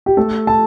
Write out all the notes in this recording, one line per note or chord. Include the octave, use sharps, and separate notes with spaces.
G4
A3 A4
A5